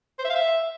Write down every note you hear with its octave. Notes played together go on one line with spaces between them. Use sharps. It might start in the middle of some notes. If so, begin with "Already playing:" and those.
C5
E5
F5
E5